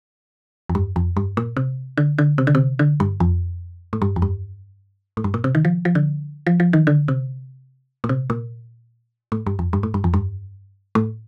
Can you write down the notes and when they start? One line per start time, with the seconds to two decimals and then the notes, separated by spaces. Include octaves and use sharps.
0.69 F2
0.75 G2
0.96 F2
1.17 G2
1.37 A#2
1.57 C3
1.98 D3
2.18 D3
2.38 C3
2.47 D3
2.55 C3
2.79 D3
3.00 G2
3.20 F2
3.93 A2
4.02 G2
4.16 F2
4.22 G2
5.17 A2
5.24 G2
5.34 A#2
5.44 C3
5.55 D#3
5.65 F3
5.85 F3
5.95 D3
6.47 F3
6.60 F3
6.73 D#3
6.87 D3
7.08 C3
8.04 A#2
8.09 C3
8.30 A#2
9.32 A2
9.47 G2
9.59 F2
9.73 G2
9.83 A2
9.94 G2
10.04 F2
10.14 G2
10.95 A2